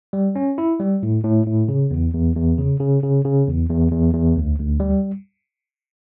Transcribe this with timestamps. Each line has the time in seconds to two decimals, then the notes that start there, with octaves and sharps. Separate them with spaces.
0.13 G3
0.36 C#4
0.58 E4
0.80 G3
1.03 A2
1.24 A2
1.46 A2
1.69 C#3
1.91 E2
2.14 E2
2.36 E2
2.59 C#3
2.80 C#3
3.03 C#3
3.25 C#3
3.47 E2
3.69 E2
3.92 E2
4.14 E2
4.36 D2
4.59 D2
4.80 G3